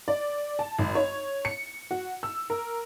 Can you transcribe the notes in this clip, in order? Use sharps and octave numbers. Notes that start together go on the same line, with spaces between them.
D5
A5
G#1
C#5
C#7
F#4
E6
A#4